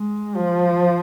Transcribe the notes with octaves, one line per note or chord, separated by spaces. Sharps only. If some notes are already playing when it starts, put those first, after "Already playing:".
Already playing: G#3
F3